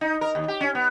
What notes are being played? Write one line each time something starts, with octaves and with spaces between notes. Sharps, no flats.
D#4
A#4
D#2
G4
C#4
B3